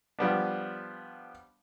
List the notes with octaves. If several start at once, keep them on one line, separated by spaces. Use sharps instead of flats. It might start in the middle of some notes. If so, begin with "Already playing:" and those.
F3 G3 B3 D4